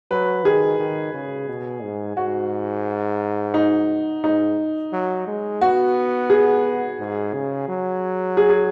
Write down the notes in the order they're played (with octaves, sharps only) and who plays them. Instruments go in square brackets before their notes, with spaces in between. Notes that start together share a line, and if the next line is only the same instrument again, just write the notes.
[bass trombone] F#3 [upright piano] B4
[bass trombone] D#3 [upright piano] G#4
[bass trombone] D#3
C#3
B2
G#2
[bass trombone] G#2 [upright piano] F#4
[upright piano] D#4
[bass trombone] G#2 [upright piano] D#4
[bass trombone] F#3
G#3
[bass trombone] B3 [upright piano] F#4
[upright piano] G#4
[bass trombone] G#2
C#3
F#3
[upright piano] G#4
G#4